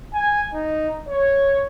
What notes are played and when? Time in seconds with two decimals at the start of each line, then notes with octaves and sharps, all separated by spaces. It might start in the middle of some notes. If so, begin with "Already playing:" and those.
0.14 G#5
0.53 D#4
1.08 C#5